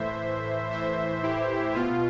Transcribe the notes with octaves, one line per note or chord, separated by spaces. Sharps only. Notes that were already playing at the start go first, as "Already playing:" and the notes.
Already playing: A2 E3 C5 E5
A2 E3 C5 E5
E4 G4
B2 F4